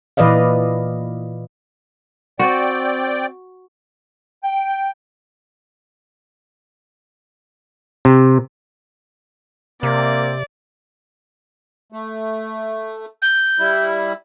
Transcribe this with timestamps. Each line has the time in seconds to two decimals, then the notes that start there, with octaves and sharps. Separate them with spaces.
0.17 A#2 E3 B4 D5 D#5 F5
2.39 C4 F#4 D5 G5
4.43 G5
8.05 C3
9.83 C3 A#3 C4 D5
11.92 A3
13.22 G6
13.59 G3 E4